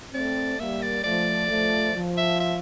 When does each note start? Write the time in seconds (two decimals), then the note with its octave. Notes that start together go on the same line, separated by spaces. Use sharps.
0.14 A3 C4 D5
0.59 G3 A#3 E5
0.82 D5
1.04 F3 A3 D5
1.49 F3 A3
1.94 F3
2.17 E5
2.40 E5